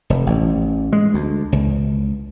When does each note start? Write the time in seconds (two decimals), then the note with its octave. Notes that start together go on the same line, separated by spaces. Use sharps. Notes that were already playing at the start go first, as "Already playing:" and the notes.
0.10 F1
0.26 A1
0.93 G#3
1.14 D2
1.52 C#2